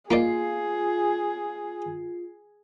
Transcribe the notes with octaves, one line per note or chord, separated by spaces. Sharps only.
A#3 D#4 F4 G#4 D5